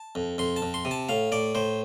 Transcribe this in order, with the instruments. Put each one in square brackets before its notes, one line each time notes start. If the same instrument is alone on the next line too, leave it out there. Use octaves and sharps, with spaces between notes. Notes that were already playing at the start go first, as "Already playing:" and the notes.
Already playing: [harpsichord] A5
F2
F2 C6
A5
F2
C6
C3
A5
A2 F5
A2 D5
A2 C5